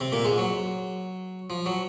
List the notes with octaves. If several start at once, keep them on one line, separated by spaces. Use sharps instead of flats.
C3 C4
A#2 A#3
G#2 G#3
F#3
F3
F#3